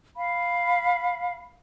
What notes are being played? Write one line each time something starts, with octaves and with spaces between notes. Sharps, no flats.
F5 B5